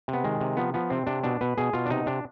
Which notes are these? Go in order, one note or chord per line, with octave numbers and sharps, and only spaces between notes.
C3
B3
D#3 G#3
C3
F3 B3
F3 B3
C3 C4
C3 D4
B2 D4
B2 B4
B2 G#4
B2 F4
D4
C3 D#4
C3 D4